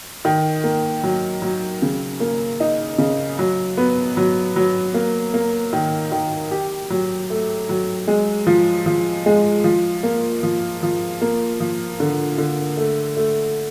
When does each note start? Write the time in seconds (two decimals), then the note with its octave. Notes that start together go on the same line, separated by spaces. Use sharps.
0.25 D#3
0.64 A#3
1.03 F#3
1.42 F#3
1.82 C#3
2.20 A#3
2.60 D#4
2.98 C#3
3.39 F#3
3.77 B3
4.17 F#3
4.56 F#3
4.94 A#3
5.34 A#3
5.73 D#3
6.12 D#3
6.51 G4
6.90 F#3
7.30 A3
7.69 F#3
8.08 G#3
8.47 F3
8.86 F3
9.26 G#3
9.64 F3
10.03 A#3
10.43 F3
10.83 F3
11.22 A#3
11.60 F3
12.00 D3
12.38 D3
12.77 A3
13.17 A3